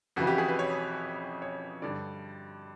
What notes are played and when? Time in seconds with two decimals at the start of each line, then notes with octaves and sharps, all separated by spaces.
0.16 F2 C#3 E3 F#4
0.27 G4
0.38 G#4
0.48 B4
0.59 C#5
1.42 C#5
1.82 G2 D3 D5